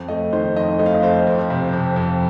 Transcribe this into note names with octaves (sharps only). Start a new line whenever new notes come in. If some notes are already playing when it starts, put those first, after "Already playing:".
Already playing: F2
A3 D#5
D#3 C5
F2 D#5
A3 D#5
F5
D#5
F2 C5
F2
C3
F2
F2